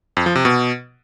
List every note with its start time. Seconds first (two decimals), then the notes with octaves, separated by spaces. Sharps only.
0.17 F2
0.26 F3
0.35 C3
0.45 B2